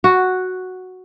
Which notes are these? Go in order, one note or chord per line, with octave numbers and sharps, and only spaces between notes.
F#4